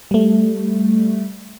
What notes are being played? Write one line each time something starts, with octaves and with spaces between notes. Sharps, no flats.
G3 A3